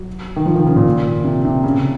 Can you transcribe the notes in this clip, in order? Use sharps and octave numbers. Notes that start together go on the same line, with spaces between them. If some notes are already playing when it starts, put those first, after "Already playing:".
Already playing: F#3
D#3
F3
D#3
C#3
A#2
C3
C3
C#3